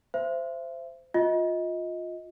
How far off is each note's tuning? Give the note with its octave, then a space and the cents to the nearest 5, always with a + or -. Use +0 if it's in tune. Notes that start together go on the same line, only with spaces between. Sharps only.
C5 -10 E5 +35
F4 +20 D#5 +20